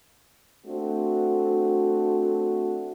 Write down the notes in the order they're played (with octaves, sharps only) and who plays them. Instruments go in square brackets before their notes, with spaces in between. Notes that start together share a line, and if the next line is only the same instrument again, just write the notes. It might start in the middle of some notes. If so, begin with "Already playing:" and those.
[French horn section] A3 C4 D4 F#4